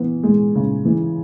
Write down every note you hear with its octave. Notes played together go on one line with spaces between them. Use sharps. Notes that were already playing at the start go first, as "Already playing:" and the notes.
Already playing: E3 B3
G#3
C#3
E3